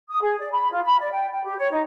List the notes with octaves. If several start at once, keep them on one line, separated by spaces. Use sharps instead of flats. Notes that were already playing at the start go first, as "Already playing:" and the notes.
D#6
G#4
D5
B5
F4
B5
D5
G5
G5
G4
C#5
D#4